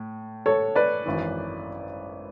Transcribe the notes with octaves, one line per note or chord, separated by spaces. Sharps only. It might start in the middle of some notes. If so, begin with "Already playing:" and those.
Already playing: A2
A4 C#5
B4 D5
G#1 F#2 E3